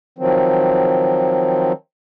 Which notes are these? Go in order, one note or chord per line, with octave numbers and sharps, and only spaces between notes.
D#3 F3 F#3 C4